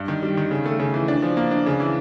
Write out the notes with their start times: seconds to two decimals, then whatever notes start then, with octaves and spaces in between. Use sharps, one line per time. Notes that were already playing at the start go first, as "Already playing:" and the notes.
Already playing: G2
0.08 D#3
0.23 G3
0.37 D#3
0.51 C#3
0.66 A3
0.79 C#3
0.94 E3
1.08 D4
1.22 F3
1.37 A#3
1.51 D4
1.66 C#3
1.80 E3